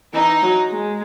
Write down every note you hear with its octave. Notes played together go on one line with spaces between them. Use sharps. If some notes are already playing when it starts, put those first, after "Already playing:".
E3 D#4
F#3
G#3